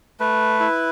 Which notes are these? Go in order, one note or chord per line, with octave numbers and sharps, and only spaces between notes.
A3 B4
E4